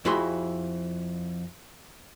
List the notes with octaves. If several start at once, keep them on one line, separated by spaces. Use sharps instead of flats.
F2 E4 F#4 G#4 B5 C6